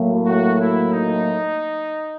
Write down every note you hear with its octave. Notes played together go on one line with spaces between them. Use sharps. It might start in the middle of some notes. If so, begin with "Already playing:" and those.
Already playing: A2 F#3 A#3
F#4
E4
D#4